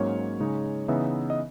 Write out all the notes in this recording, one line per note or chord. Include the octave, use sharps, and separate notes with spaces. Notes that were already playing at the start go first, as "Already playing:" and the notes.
Already playing: G#2 F#3 A#3 C#4 C#5
C#3 G#3 D#4
C#3 E3 B3 D#4 E5
D#5